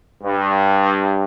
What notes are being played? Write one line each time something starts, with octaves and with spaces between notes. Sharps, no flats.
G2